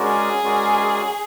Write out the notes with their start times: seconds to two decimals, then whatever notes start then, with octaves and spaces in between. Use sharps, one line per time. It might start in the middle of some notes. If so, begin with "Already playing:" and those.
Already playing: G#3 C#4 F#4 A#4 D5
0.09 G#4
0.43 G#3 C#4 F#4 A#4 D5